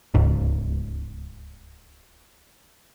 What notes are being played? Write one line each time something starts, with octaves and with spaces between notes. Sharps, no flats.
D1 C#2 G#2